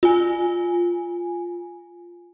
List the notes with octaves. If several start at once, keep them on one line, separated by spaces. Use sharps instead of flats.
F4 G#5